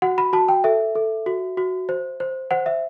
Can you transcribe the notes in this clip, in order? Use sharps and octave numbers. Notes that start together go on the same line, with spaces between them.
F#4 F#5
B5
F#4 A5
G5
A4 E5
A4
F#4
F#4
C5
C5
C5 F#5
E5